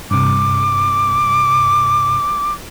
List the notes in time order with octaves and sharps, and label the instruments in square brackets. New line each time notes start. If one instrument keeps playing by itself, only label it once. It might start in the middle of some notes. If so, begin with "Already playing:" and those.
[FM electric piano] G2 C3 [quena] D6